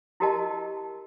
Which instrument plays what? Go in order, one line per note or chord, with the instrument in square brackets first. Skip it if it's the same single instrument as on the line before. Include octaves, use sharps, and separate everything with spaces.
[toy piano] E4 F#4 G4 A#4 D#5 A5